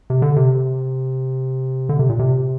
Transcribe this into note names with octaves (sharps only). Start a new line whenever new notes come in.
C3
D3
C3
D3
C3
A#2
C3